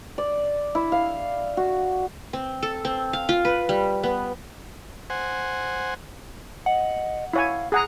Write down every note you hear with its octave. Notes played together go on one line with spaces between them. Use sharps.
D5
E4
F5
F#4
C4
A4
C4
F5
F4
B4
G3
B3
C5 F#5 G#5
D#5 F#5
E4 C#5 F5 G#5
G#4 F#5 A#5 D#6